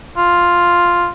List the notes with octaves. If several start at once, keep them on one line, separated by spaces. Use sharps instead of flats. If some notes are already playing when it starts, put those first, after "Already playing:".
F4